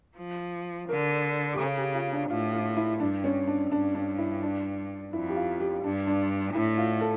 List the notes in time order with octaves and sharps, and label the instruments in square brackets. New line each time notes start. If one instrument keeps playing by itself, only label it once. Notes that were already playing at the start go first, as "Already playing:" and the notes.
[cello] F3
[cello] D3 [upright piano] A#4
[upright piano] G4
[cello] C#3 [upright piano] A4
[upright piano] G4
F4
D4
[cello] A2 [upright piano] F4
[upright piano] F4
E4
[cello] G2 [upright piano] D4
[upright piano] C#4
D4
[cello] G2 [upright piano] D4
[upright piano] D4
E4
D4
[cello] F2 [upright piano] E4
[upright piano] G4
F4
G4
[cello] G2 [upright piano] D4
[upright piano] D4
[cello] A2 [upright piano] E4
[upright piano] F4
A4